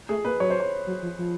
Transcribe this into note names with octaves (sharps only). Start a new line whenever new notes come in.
A3 G#4
A#3 B4
F#3 C#5
C5
C#5
F#3
F3
F3